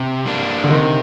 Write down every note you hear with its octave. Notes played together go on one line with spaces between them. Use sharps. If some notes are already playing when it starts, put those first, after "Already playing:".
Already playing: C3
G3 A#3 D4
D3
C3 D#3